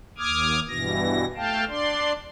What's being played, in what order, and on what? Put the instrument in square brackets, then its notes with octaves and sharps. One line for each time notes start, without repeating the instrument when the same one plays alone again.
[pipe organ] D#2 D6 D#6 F6 G#6
G2 B2 E3 A#6
A3 F5 G5 A5
D4 D5 C6